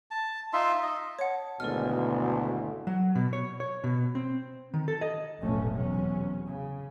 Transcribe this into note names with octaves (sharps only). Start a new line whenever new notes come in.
A5
D#4 F4 E5 C6
D#5
C#5 F#5 A5
G#1 D2 B2 E4 A4 D#5 F6
F#3
B2
C#5
C#5
B2
C4
D#3
A4
D#5
F1 B1 F2 A2 A3 C#4
E2 C3 F#3 C#4
C#3